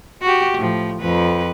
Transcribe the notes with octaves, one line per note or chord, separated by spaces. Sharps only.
F#4 G4
A2 F3
F2 F3 B4